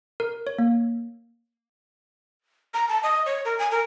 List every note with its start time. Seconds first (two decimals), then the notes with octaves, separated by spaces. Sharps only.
0.20 A#4
0.47 C#5
0.58 A#3
2.74 A#5
2.88 A5
3.03 D#5
3.26 C#5
3.45 A#4
3.59 G#5
3.71 A#4